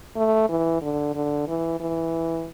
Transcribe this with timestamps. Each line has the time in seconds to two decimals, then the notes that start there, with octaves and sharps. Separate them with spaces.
0.16 A3
0.49 E3
0.82 D3
1.15 D3
1.48 E3
1.80 E3